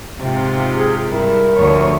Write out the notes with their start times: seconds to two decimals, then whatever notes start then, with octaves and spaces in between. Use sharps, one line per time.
0.18 G#2 C3 F4
0.75 G#4
1.09 G2 E4 A#4
1.57 D2 F3 C#5